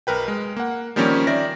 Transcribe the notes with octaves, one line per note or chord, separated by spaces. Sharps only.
B1 A#4 B4 G5
G#3
A#3 F#5
D#3 F3 G3 A#3 C4 C#4
D#3 D5 E5 A#6